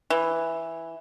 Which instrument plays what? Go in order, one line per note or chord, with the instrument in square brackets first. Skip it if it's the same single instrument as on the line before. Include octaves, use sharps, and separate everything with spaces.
[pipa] E3